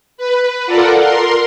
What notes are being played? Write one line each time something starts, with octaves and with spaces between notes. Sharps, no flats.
B4
F4 A4 A#4 D5 F#5
A#4 C6